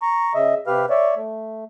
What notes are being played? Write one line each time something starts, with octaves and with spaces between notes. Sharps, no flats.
A#5 C#6
C#3 D#5 E5
C3 G4 B4 F5 F6
C#5 D5 E5
A3